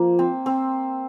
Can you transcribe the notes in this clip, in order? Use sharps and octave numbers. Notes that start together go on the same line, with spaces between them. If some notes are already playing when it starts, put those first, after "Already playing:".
Already playing: F3 A#3
C4
C4